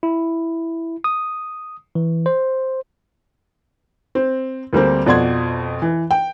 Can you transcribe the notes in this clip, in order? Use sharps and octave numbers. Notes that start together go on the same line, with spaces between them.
E4
D#6
E3
C5
C4
D2 G3 A#3 C4
F2 B2 D5 F#5 C6 G#6
E3
G5